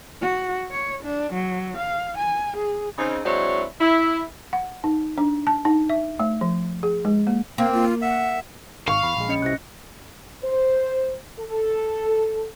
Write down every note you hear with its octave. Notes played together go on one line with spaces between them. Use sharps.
F#4
C#5
D4
F#3
F5
G#5
G#4
C#3 C4 D#4
F#3 G#3 C4 D4 E4 C#5
E4
F#5
D#4
D4
A5
D#4
E5
A3
F3
G#4
G#3
A#3
A#3 C4 F5
F4
E5 F#5
G#1 F5 C#6
E2 B5
A#1 G#3
C#4 D#5 C#7
C2 C3 E4 F#6 A#6
C5
A4